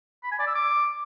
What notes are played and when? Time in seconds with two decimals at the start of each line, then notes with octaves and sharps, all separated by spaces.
0.24 B5
0.31 G#5
0.39 D5
0.47 E6
0.55 D6